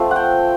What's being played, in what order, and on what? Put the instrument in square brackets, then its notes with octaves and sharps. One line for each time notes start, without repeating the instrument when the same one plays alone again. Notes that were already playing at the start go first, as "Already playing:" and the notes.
Already playing: [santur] F3 A3 C4
F#5 G5